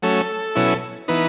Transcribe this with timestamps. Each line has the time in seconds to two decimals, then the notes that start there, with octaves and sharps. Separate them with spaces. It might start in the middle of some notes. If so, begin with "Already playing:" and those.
0.02 F#3 A3 C#4 A4
0.55 B2 F#3 C#4 E4
1.08 E3 B3 D#4 B4